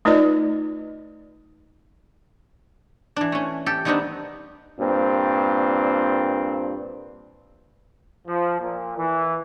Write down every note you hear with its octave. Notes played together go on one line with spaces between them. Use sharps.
A3 D#4 F4 B4 D5 D#5
E3 D4
A3 C#4
G4 A4
D#3 G3 B3 C4 D4 D#4
G2 A#2 C4
F3
A#2
E3